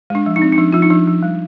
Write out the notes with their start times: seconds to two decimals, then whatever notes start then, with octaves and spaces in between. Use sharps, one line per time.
0.10 G#3 D4
0.26 F3
0.36 D#4
0.42 C4
0.52 D#4
0.58 F3 D4
0.72 F3 F4
0.82 D#4
0.90 F3 D4
1.07 F3
1.23 G3